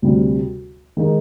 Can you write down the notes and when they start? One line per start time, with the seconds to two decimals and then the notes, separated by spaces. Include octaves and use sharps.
0.02 D2 C3 G3
0.97 D#3 G#3 D#4